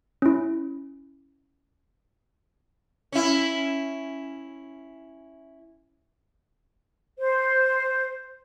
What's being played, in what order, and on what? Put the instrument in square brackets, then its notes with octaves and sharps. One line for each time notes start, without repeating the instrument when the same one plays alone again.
[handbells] C#4 E4
[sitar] C#4 E4
[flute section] C5